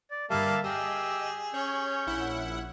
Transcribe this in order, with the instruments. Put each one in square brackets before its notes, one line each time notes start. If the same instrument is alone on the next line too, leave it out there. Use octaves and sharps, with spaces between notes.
[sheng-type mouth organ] D5
[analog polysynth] G2 D3 G3 [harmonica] A#3 [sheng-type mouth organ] E5 F5 A5
[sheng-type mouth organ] G4 E6 [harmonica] G#4 [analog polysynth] D#5
[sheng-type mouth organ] C#4 G6 [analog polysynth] C#5
[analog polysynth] A#1 E4 F#5